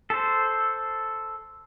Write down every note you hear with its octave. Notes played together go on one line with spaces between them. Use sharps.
A4 C5